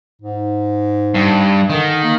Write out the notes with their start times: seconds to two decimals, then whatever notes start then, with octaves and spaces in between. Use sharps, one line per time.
0.22 G#2
1.14 G2
1.69 D3 D#3
2.04 A#3